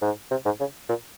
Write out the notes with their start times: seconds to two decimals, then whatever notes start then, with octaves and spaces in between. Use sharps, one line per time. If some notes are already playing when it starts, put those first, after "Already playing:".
0.02 G#2
0.31 C3
0.45 G#2
0.60 C#3
0.89 A#2